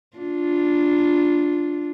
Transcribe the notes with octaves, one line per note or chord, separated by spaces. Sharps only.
D4 F4